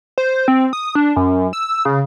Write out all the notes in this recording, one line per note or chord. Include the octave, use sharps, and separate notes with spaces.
C5
C4
D#6
D4
F#2
E6
C#3